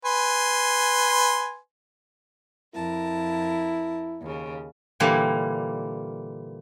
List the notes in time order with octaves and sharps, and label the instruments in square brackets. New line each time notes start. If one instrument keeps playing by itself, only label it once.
[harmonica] B4 G#5 C6
[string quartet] F2 A#4 A5 [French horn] E4
[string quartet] D#2 C#3
[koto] A#2 D3 E3 G3 A#3